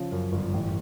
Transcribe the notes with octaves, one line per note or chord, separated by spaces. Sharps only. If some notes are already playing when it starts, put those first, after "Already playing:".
Already playing: C#3 F3 C#5
F#2
G1
A1